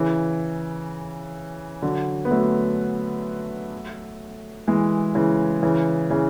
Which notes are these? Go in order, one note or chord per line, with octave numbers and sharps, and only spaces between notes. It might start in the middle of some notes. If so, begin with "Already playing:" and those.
Already playing: C#3 E3
D3 F#3
B3
F#3 A3
E3 G#3
C#3 E3
C#3 E3
C#3 E3